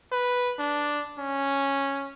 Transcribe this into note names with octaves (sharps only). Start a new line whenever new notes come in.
B4
D4
C#4